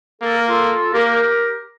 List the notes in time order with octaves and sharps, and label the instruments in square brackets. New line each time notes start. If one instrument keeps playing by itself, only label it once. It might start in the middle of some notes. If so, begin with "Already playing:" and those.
[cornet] A#3 [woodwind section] A4
[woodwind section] A#4
F4 A4
[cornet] A#3 [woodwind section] G4 A#4